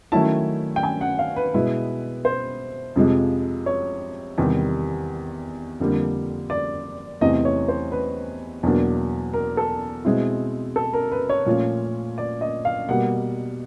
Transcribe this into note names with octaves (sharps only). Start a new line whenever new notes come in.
D#3 F#3 A3 C#4 E4 A5
G5
G#5
F#5
F5
B4
B2 G#3 B3 E4
C5
F2 C3 F3 G#3
C#5
E2 C3 D#3 G3
F2 D3 G3 A#3
D5
E2 C3 E3 A3 C4 D#5
C#5
C5
B4
E2 B2 F#3 A#3 D4
A#4
A4
B2 G#3 C4 E4
A4
A#4
B4
C#5
A#2 F3 A3 C#4 F4
D5
D#5
F5
B2 G3 A#3 F#5